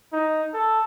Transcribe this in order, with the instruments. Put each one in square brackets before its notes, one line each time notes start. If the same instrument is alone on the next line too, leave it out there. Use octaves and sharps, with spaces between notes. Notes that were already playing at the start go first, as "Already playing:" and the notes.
[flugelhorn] D#4
A4